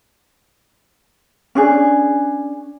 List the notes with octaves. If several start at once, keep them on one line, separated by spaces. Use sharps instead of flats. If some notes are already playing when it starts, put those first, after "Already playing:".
C#4 D4 G#4